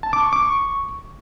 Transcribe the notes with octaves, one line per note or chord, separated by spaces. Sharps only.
A5
D6
C#6
D6
C#6